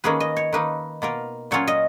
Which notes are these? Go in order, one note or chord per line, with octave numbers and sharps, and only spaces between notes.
D#3 A#3 C#4 G#4 B4
D#5
C#5
D#3 A#3 D#4 B4
B2 A#3 F4 A#4
A#2 F#3 C#4 F4 C#5
D#5